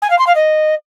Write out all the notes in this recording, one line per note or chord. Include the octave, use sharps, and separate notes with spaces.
G#5
F5
C6
F5
D#5